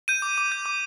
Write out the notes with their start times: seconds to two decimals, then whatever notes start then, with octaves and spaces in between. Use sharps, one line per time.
0.08 G6 D#7
0.22 D6
0.38 D6
0.52 G6
0.66 D6